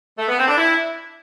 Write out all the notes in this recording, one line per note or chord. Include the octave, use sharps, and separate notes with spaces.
A3
B3
C4
D4
E4